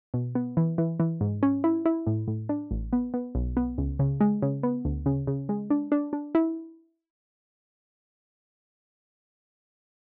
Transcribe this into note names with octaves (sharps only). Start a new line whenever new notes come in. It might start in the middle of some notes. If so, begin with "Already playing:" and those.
B2
B3
E3
E3
E3
G#2
C#4
E4
E4
A2
A2
D4
A1
B3
B3
B1
B3
C#2
C#3
G#3
C#3
B3
D2
C#3
C#3
G#3
D4
D4
D4
E4